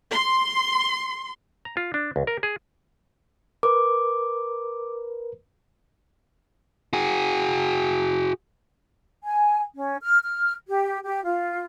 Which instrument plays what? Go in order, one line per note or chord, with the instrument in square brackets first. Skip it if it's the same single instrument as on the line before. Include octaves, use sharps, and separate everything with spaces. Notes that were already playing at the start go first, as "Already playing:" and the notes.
[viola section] C6
[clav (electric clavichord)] A#5
F4
D4
C#2
A#4
G#4
[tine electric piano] A#4 B4 [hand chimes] D6
[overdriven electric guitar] F#4 G#4
[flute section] G#5
C#4
F6
F6
G4
G4
F4